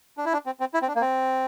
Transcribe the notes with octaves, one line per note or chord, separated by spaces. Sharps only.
D4
E4
D4
C4
C4
E4
C4
D4
A#3
C4